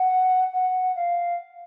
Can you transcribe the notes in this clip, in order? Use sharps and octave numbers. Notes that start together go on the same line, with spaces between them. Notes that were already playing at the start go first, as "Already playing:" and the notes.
Already playing: F#5
F#5
F5